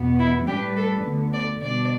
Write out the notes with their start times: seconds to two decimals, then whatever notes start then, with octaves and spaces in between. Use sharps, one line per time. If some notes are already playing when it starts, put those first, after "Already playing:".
Already playing: E2 B2 B3
0.19 E4
0.47 A2 G3 D4 G4 B4
0.77 A4
1.04 D2 D3 B3
1.34 D5
1.62 B2 G3 D4 D5